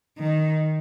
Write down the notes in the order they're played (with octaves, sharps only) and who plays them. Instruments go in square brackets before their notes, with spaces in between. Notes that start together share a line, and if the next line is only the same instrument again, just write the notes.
[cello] D#3